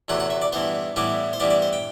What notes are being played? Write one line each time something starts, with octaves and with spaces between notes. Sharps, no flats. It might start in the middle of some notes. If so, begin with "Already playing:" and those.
E2 C3 F#3 A3 F#5
F#5
E5
D5
G2 E3 B3 C5
A2 E3 G3 B3 D5
C5
G2 E3 G3 B3 D5
D5
C5
G5